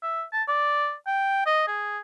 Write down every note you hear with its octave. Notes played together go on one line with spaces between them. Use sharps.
E5
A5
D5
G5
D#5
G#4